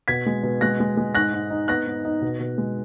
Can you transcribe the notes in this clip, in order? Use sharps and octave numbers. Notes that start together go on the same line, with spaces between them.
B2 G#6 B6
G#3
B2
G#3 F#6 A#6
G#3
G#3
G#2 F#6 A#6
G#2
D#4
B3 F#6 A#6
G#2
D#4
B2
B2
G#3